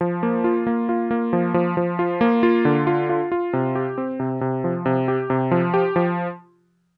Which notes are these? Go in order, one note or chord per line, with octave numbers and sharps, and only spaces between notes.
F3
A#3
F4
A#3
F4
A#3
F3
F3
F3
F4
A#3
F4
D3
F4
F4
F4
C3
G4
C4
C3
C3
F3
C3
G4
C3
F3
G4
F3